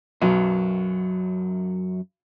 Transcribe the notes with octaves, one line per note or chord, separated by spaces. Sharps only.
B1 F#2 F#3